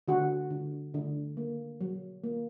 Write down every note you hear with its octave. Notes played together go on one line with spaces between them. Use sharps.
D3 F#4
D3
D3
A#3
F#3
A#3